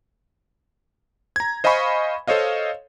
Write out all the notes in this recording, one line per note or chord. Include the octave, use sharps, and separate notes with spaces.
A#5 G#6
C5 D#5 F5 G#5 B5 C#6
A4 C5 C#5 D#5 F5